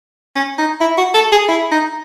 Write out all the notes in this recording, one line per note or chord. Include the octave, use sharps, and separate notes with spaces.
C#4
D#4
E4
F#4
A4
G#4
E4
D#4